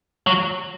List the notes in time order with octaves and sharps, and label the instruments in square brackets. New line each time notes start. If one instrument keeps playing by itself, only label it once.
[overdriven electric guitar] F#3